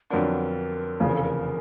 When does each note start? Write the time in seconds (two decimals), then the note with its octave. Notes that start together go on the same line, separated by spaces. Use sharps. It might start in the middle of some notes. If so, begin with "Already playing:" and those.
0.10 F2 D3 F#3 B3 D4 A#4
1.00 F1 E2 C#3 F3
1.08 A#4
1.16 A4
1.23 A#4